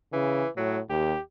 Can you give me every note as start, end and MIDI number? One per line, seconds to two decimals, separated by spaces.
0.13 0.43 49
0.13 0.48 52
0.57 0.81 45
0.57 0.80 54
0.89 1.14 39
0.89 1.20 67